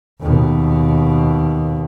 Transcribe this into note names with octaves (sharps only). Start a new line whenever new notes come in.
D#2 B2